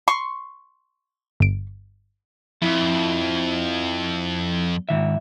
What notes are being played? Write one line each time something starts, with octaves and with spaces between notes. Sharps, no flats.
C6 C#6
G1 D7
F2 E4
G#2 D#3 E5